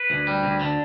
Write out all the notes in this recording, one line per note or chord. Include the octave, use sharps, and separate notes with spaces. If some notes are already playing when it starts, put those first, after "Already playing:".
Already playing: B4
D2
G3
D2
D3